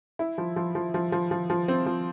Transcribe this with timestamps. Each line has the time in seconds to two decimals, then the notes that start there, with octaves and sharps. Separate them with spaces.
0.19 E4
0.38 F3
0.56 F3
0.75 F3
0.94 F3
1.12 F3
1.31 F3
1.50 F3
1.68 C4
1.86 F3